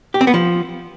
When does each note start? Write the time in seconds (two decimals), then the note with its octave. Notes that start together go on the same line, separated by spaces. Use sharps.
0.14 G4
0.21 C4
0.27 B3
0.34 F3